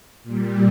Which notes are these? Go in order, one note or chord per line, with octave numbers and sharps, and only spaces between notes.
A#2 G3